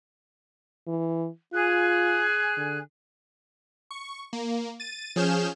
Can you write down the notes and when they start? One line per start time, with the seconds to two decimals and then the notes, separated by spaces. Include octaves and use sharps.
0.87 E3
1.53 F4 G#4 G#5 F#6
2.57 D3
3.91 C#6
4.33 A#3
4.80 A6 D#7
5.16 F3 C#4 G#4 F6 G6 E7